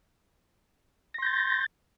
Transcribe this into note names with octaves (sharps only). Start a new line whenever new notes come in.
C6 G6 A6 A#6